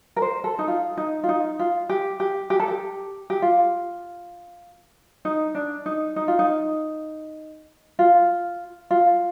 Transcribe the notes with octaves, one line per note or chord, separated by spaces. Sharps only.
A#4
C5
A4
D#4
F4
D#4
F4
D#4
F4
G4
G4
G4
A4
G4
G4
F4
D#4
D4
D#4
D#4
F4
D#4
F4
F4